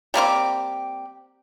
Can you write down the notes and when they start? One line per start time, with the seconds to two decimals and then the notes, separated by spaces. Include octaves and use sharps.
0.14 G3 A#3 C4 G4